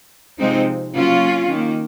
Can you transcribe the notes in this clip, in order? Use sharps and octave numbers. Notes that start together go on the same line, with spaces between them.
C3 F3 G#3 C4 D#4
C#3 F#3 A#3 C#4 F4
D#3 A#3